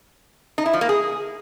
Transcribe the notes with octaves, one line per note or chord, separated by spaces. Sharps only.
D#4
E4
F3
A#3
G#4